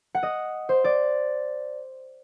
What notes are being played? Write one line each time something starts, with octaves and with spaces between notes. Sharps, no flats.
F#5
D#5
C5
D5